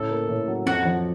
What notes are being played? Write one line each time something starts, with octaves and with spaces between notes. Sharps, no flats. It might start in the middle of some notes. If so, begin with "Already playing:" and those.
Already playing: A2 C#3 A4
A#3
A2
F#3
F2 F#4
F3